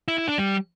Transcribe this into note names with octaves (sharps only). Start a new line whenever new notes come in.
E4
E4
D4
G3